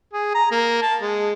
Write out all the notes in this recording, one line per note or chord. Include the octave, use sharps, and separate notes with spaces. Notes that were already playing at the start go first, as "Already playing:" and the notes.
G#4
A#5
A#3
A5
G#3